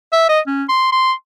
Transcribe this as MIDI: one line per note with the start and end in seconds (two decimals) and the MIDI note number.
0.13 0.25 76
0.29 0.40 75
0.47 0.64 61
0.69 0.90 84
0.92 1.12 84